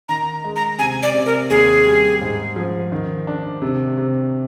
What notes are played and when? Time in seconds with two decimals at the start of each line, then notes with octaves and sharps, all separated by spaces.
0.09 D#3 A#5
0.44 G#3
0.56 A#5
0.79 C3 G#5
1.03 D5
1.14 C3
1.26 A#4
1.50 D#2 G#4
1.85 G3
2.21 G#2
2.56 F3
2.92 D#3
3.27 D4
3.62 C3
3.98 C3